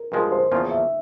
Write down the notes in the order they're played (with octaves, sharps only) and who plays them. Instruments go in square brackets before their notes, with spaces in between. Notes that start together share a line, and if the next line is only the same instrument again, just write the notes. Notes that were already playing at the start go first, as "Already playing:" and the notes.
Already playing: [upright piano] A#4
[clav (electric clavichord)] G2 F3 G#3 [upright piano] A#4
[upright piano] C5
[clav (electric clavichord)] E2 C#3 F3 A#3 F4
[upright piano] E5